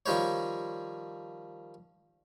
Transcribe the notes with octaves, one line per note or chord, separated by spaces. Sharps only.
D#3 F3 G3 C5 C#5